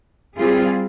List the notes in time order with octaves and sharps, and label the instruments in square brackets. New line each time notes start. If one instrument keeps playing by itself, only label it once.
[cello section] G3 C4 F4 G#4